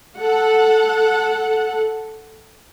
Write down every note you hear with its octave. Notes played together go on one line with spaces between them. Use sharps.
A4 F#5